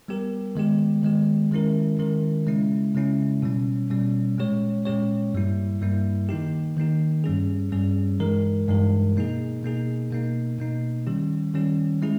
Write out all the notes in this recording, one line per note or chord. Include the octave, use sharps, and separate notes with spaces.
G3 B3 G4 A#4
D#3 G#3 B3 G4
D#3 G#3 B3 G4
D#3 G#3 C#4 E4 A#4
D#3 G#3 C#4 E4 A#4
C#3 G#3 C#4 E4
C#3 G#3 C#4 E4
B2 G3 C#4
B2 G3 C#4
A#2 G#3 C#4 G4 C#5
A#2 G#3 C#4 G4 C#5
G2 G3 A#3 E4
G2 G3 A#3 E4
D#3 A#3 D#4 G4
D#3 A#3 D#4 G4
G2 G3 C#4 G#4
G2 G3 C#4 G#4
G2 E3 G#3 D#4 A#4
G2 E3 G#3 D#4 A#4
B2 A#3 D#4 G#4
B2 A#3 D#4 G#4
B2 A#3 D#4
B2 A#3 D#4
D#3 G3 C#4 G4
D#3 G3 C#4 G4
G#3 C#4 E4 G#4